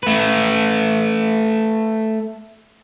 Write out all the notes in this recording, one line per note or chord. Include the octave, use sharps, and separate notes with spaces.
A3 B4